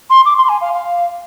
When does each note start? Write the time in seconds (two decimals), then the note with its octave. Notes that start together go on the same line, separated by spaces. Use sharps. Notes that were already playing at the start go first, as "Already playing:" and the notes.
0.10 C6
0.25 D6
0.38 C6
0.49 G#5
0.61 F5
0.73 F5